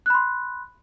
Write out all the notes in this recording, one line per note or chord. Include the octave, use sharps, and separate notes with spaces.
B5 C6 F#6